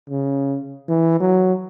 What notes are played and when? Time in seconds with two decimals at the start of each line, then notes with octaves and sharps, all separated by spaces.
0.10 C#3
0.88 E3
1.20 F#3